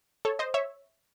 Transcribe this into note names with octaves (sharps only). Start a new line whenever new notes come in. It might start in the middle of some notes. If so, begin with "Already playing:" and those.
A4 C#5
C5 D#5
C#5 E5